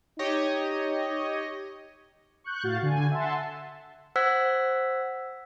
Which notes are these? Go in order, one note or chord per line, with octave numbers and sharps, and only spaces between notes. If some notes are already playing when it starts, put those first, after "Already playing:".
D#4 G4 C#5 D#5
C#6 F#6 G6
A2 F#4 F5 A6
D3 G#5
E5 F#5 A5 C6
C5 F#5 E6 F#6 G#6 B6